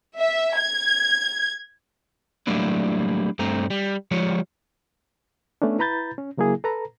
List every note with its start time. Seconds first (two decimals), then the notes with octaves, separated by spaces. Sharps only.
0.17 E5
0.56 G#6
2.47 F#3 G3 A3 A#3 D4 E4
3.39 G2 A3 C4 A#5
3.70 G3
4.11 F3 G3 G#3 F4 C#5
5.62 A3 B3 C#4 D4
5.79 E4 B4 A#5 B5 G6 A6
6.18 C#4
6.38 C#3 F#3 A#3 E4 G#4
6.64 A4 B4 A#5